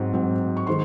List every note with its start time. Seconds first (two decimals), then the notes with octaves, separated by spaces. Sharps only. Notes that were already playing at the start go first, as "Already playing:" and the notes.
Already playing: G#2 F#3 C4
0.13 G#2 F#3 C4
0.57 C#6
0.67 D#3 G#3 C5 C6